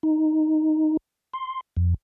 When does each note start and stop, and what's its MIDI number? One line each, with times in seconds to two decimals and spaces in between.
0.03 0.97 63
1.33 1.61 84
1.77 1.94 41